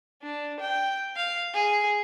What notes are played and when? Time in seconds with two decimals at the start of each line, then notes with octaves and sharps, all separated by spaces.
0.22 D4
0.60 G5
1.16 F5
1.54 G#4